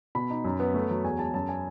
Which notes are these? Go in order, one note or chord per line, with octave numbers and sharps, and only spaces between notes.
B2 B5
D#4
F#2
B3
A3
F#3
E2 G#5
G#3 A5
F#2 A5
G#5